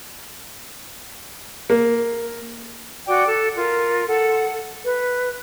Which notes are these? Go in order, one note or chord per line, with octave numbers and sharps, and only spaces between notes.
A#3
F#4 D5 G5 D6
A4
F4 A#4
A4 F#5
B4